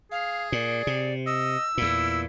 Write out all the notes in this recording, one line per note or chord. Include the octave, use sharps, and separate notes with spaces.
G#4 F5
A#2 D5
C3
D#5 E6
E2 A#2 E4